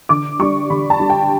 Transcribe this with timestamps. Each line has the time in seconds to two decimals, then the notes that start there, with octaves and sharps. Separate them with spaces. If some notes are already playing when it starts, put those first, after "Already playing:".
0.09 D3 D6
0.39 G3 D4 C#6
0.70 D3 B5
0.90 A5
0.99 G3 D4
1.10 G5